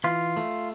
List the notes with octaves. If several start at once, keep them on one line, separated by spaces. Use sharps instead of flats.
E3 F4
A3